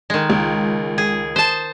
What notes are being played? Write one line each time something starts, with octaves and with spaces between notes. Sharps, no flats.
D#3 G#3
C#2
G#4
C5 A5